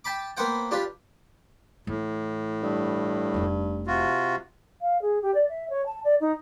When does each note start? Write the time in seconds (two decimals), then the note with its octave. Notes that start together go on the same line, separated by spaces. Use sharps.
0.04 G5 A5 B5 D6
0.37 A#3 B3 B4 C5 F#5 G5
0.71 D4 F4 G4 B4
1.87 A2 E3
2.62 G2
3.34 F1 D#4
3.87 C3 F4 F#4
4.82 F5
5.02 G#4
5.22 G4
5.35 D5
5.49 E5
5.70 C#5
5.86 A5
6.04 D5
6.21 D#4